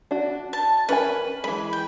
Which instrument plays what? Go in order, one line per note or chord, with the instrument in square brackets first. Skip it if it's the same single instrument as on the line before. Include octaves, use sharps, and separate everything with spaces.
[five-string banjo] D4 F#4
[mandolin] A5
[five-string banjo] C#4 A#4 G#5 [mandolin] B4
[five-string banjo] E3 G#3 [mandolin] B5
[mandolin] G5